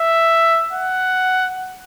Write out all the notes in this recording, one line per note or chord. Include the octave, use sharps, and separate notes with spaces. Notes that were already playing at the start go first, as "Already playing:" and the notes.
Already playing: E5
F#5